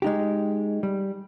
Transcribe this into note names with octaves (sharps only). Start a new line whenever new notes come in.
G#3 D#4 G4
G3